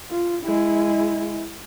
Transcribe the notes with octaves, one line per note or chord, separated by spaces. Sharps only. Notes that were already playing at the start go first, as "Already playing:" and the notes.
F4
G#3 E4